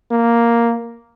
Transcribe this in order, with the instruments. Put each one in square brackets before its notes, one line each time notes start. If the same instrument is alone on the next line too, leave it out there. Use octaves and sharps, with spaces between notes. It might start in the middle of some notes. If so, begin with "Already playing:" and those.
[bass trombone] A#3